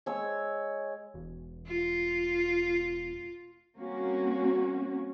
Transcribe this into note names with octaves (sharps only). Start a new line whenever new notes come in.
G#3 C#5 E6
E1
F4
G3 A#3 C4 C#4 F#4